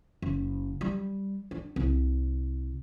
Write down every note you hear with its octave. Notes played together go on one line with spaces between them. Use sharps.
F#1
G3
D4
C2